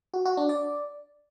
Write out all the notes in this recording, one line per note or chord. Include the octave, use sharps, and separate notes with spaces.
F#4
F#4
D4
D5